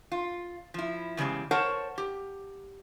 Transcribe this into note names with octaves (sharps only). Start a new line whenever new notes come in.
F4
F3 E4
E2 C#3 E3 G3 G#3
A#4 C5 C#5 F#5 A5
G4